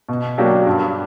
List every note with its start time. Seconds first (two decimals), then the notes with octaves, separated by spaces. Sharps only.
0.09 B2
0.38 F#3 A#3 D4 G4
0.66 G2